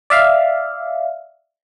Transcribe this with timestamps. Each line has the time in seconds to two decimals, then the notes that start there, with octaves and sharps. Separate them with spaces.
0.10 D5 E5 F5